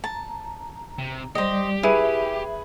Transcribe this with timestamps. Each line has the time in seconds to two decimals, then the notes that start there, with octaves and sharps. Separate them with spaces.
0.04 A5 A#5
0.98 C3
1.35 G3 G4 C5 D5 D#5
1.83 E4 G#4 B4 E5 D#7